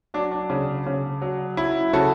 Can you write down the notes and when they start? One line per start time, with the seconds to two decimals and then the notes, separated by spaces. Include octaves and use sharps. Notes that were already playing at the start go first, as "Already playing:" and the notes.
0.14 F#3 D4
0.31 D4
0.50 C#3
0.86 C#3
1.22 F#3
1.57 F#3 E4
1.93 C#3 F#4 A4